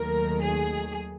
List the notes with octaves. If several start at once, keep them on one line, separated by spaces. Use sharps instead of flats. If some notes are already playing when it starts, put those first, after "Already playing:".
Already playing: D#2 D#3 F#3 A3 A#4
G#4